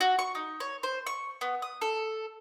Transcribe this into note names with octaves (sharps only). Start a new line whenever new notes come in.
F#4
C#6
D#4
C#5
C5
C#6
B3
D#6
A4